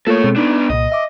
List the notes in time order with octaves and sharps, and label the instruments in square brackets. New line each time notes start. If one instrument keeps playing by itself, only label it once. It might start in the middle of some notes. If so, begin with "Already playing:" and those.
[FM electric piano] A3 A#3 F4 [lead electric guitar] A4 C#5
[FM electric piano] B2 G#3 C4
[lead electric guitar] B3 D4 [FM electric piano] D#4
[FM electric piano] C2 A#2 [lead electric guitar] D#5
[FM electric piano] E5 D6